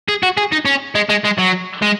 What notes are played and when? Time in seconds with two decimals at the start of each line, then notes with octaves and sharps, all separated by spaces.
0.08 G#4
0.23 F#4
0.37 G#4
0.52 D#4
0.65 C#4
0.95 G#3
1.09 G#3
1.24 G#3
1.38 F#3
1.82 G#3